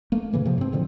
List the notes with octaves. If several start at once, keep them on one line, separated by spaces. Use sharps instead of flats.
A3 A#3
A2 C#3 E3 A#3
C3 F3
G#2 C4
A2 D3 D#3 F3